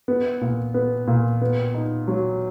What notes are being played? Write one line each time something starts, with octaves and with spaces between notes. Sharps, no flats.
B3
A#2
B3
A#2
B3
D#4
F#3